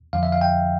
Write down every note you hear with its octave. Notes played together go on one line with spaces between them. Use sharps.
F2 D3 F3 F5
E5
F5
G5